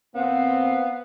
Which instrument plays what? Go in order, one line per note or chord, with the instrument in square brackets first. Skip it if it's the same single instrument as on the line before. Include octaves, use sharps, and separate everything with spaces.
[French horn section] A#2 C4 [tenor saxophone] B3 [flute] F5